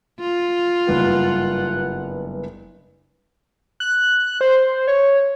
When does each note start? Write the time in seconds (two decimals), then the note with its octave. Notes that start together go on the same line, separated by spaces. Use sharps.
0.20 F4
0.87 F#1 G2 B3 F#5
3.80 F#6
4.41 C5
4.87 C#5